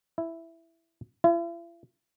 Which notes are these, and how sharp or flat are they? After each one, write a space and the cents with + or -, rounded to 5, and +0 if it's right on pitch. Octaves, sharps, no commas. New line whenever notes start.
E4 +5
E4 +45